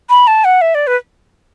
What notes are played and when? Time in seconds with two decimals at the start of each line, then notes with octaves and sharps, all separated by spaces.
0.09 B5
0.27 A5
0.44 F#5
0.61 E5
0.75 D5
0.87 B4